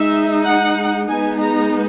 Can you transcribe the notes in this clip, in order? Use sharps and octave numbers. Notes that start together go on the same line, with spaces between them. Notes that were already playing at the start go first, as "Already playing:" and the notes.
Already playing: G#3 D#4 E5
F#5
G#3 B3 D#4 G#5
A#5